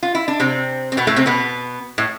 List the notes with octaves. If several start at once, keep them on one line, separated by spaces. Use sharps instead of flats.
F4
E4
D4
C3 C4
C4
B2 B3
A2 A3
C3 C4
B2 B3
A2